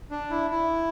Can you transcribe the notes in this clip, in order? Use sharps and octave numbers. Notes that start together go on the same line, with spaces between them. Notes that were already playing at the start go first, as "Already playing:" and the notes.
D4
E4
E4